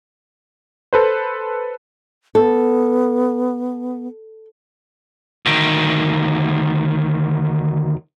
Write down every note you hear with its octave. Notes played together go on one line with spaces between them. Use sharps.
A4 B4 C5
B3 A4
D2 D#3